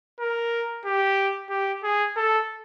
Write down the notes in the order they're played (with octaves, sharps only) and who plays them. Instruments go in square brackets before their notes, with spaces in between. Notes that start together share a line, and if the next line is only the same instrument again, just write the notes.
[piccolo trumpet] A#4
G4
G4
G#4
A4